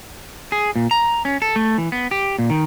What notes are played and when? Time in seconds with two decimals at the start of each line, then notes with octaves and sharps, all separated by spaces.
0.52 G#4
0.76 A#2
0.91 A#5
1.25 C#4
1.42 A4
1.56 A3
1.78 E3
1.92 B3
2.11 G4
2.39 A#2
2.50 D#3